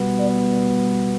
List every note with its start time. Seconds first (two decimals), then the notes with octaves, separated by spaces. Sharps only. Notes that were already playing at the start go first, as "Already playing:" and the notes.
Already playing: B2 G3 B3
0.19 D5